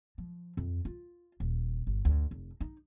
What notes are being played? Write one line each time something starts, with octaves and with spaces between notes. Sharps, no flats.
F3
F2
F4
D#1
G1
D2
F1
D#4